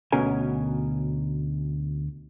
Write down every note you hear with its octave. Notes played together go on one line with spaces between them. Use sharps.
D2 B2 C#4 A#4 G#5